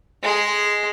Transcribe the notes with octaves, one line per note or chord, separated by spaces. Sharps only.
G#3 G#4